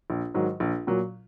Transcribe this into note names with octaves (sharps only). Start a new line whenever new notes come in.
A#1
G#2 D#3 F#3
A#1
A#2 F#3